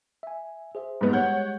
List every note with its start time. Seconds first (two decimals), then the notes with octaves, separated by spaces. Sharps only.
0.23 E5 G#5
0.75 G#4 C5 E5
1.01 G#2 G3 G#3 B3 G4
1.13 C#5 F#5 G6